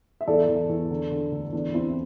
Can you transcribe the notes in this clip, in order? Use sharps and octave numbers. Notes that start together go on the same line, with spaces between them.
E5
E2 A4 D5
E2
E2
D3
D3
D2
E2 D4
E2 C4 E4